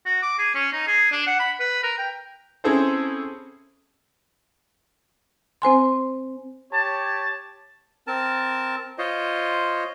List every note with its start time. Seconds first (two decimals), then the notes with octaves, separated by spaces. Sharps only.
0.06 F#4
0.23 D6
0.39 G#4
0.55 C#4
0.73 D#4
0.87 G#4
1.11 D4
1.27 F#5
1.40 B5
1.60 B4
1.83 A#4
1.98 G5
2.64 C4 C#4 E4 G#4 A4 C5
5.62 C4 C5 G#5 C6
6.72 G4 C#5 A5
8.07 C4 A#4 A5
8.98 F4 C5 C#5 D#5